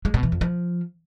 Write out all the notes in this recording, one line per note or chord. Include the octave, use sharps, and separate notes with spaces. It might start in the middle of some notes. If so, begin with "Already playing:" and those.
G#3
B2
E3
F2
F3